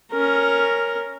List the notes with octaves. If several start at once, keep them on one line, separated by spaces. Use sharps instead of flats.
C#4 A#4